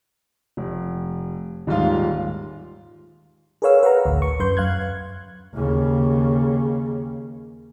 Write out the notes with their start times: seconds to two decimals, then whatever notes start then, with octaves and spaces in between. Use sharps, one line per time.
0.57 F1
1.67 D#1 G#2 D#3 F4 F5
3.62 G#4 A#4 B4 C#5 F5 E6
3.83 B4 F5 F#5 A#5
4.05 A1 D2
4.22 C#6
4.40 F#2 B4 C6 G6
4.57 F#2 F5 F#6 G#6
5.54 D#2 C#3